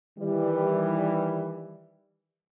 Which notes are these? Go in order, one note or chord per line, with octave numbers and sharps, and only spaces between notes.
D#3 E3 G3